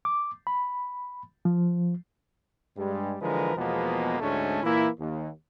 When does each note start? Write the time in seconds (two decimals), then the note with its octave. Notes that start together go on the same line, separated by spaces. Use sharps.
0.05 D6
0.47 B5
1.45 F3
2.77 G2 G3 G#3
3.21 D3 E3 F3 G#3 A#4 B4
3.56 E2 B2 F3 G#3 A#3 B3
4.20 D2 G#2 G#3 A3 C#4 D4
4.63 A#2 E3 A#3 E4
4.99 D#2